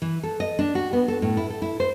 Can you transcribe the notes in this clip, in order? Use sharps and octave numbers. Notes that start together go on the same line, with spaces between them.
E3
A4
D#5
D4
F#4
B3
A4
A2
E4
A4
E4
C5